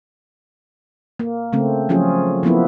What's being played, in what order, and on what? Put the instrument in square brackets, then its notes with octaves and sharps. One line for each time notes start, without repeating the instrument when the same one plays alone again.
[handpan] A#3
C#3 A3 C4
F3 F#3 C#4 F4 G#4
F3 A#3 B3 E4